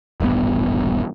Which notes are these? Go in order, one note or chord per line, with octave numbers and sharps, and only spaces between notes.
D#1 A1 G2 B3